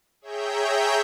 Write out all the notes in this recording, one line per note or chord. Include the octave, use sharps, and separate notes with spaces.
G#4 C#5 E5 G5 A#5 G6